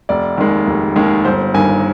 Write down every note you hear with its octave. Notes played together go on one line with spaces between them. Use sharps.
F1 D5
D#2 D#3 G#3
F1
D#2 D#3 G#3
G1 C5
G2 D#3 A#3 G#5